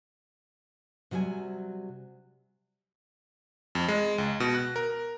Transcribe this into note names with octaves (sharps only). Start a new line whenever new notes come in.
C3 F#3 G3 D5 G#5
F2
G#3
C#2
B2
F#6
A#4